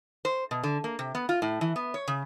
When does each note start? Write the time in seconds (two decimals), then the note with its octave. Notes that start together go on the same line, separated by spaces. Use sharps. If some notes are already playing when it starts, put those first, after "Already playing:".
0.25 C5
0.51 B2
0.63 D3
0.84 A#3
0.99 C3
1.15 B3
1.29 F4
1.42 A2
1.61 E3
1.76 B3
1.94 C#5
2.08 C#3